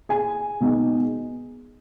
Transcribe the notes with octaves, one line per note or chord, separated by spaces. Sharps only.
G#4 G#5
B2 G#3 B3 D#4